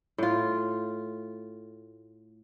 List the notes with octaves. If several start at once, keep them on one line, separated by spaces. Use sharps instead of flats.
A2 F4